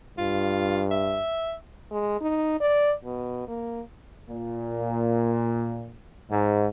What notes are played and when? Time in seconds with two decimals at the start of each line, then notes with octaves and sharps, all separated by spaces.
0.18 G2 F4
0.91 E5
1.91 G#3
2.21 D#4
2.60 D5
3.05 B2
3.48 A#3
4.29 A#2
6.31 G#2